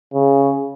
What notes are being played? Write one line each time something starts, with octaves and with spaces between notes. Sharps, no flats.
C#3